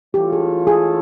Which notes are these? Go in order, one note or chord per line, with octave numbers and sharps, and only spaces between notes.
E3 A3 C#4 F4 G4 A4
G#4
G#4